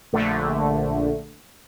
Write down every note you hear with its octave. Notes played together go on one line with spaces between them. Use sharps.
A#1 D3 A3